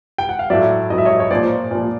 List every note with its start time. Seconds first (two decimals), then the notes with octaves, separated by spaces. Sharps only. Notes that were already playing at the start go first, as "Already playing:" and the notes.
0.18 G5
0.29 F#5
0.39 F5
0.50 A2 F#3 D5 E5
0.90 A2 F#3 D#5
0.98 E5
1.05 C#5 D#5
1.20 C#5
1.31 A#2 F3 C5 D5
1.71 A#2 F3